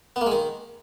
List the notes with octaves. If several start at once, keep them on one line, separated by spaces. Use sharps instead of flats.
B3
A#3
G#3
D#3